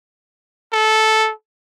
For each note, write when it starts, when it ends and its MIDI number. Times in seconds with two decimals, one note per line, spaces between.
0.73 1.32 69